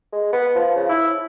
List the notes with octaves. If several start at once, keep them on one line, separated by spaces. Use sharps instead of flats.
G#3
B3
F3
C#3
E4